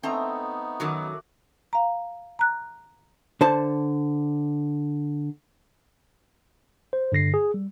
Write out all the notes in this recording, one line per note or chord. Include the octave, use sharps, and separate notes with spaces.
A3 B3 C4 D#4 A#5
F#2 D#3 F#3 F#4 D6
F5 A#5
A#5 F#6
D3 C5 A5
C5
G2 D3 A#6 C7
G#4
G3